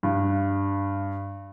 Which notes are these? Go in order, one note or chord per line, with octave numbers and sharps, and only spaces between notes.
G2